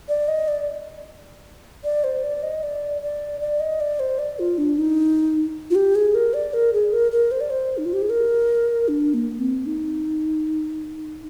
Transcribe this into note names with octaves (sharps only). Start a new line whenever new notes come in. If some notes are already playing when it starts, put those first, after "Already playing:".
D5
D#5
D5
D5
C5
D5
D#5
D5
D5
D5
D#5
D5
C5
D5
F4
D4
D#4
F4
G4
G#4
A#4
D5
A#4
G#4
A#4
A#4
C5
D5
C5
D#4
F4
G4
G#4
A#4
D4
A#3
C4
D#4